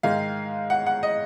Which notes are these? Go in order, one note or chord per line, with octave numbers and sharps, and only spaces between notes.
G#2 D#3 G#3 F5
F#5
F#5
D#5